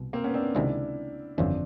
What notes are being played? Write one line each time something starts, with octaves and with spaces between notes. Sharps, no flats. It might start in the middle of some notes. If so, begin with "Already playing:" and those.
Already playing: C2 B2
A#3 C4
B3 C#4
C4 D4
C#2 C3 D#3 G#3 B3 D4 E4
G1 F2 C#3 E3 C4 D4